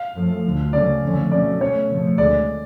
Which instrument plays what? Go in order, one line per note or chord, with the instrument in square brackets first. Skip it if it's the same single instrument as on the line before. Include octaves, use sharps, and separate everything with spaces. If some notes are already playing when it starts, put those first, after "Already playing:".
Already playing: [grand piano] F5
[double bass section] F#2 F3 A3
D2 D3 F3
[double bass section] C#2 C#3 F#3 A3 C#4 [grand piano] D5
[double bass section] F2 D3 F3 A3 C#4
[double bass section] B2 F#3 A3 C#4 [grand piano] D5
[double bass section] B2 A3 C#4 [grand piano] C#5
[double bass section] F2 C#3 F3 A3
[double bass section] D2 D3 G#3 [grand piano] D5